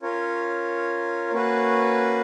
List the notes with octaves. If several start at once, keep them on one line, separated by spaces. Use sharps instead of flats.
C#4 F4 A#4 C#5
A#3 C#4 F#4 B4